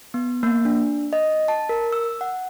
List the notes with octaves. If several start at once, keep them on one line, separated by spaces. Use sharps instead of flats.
B3
A#3
D4
D#5
A5
A#4
E6
F#5